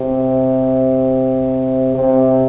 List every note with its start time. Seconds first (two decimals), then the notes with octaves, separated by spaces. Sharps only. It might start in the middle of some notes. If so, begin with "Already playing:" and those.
Already playing: C3
1.94 C3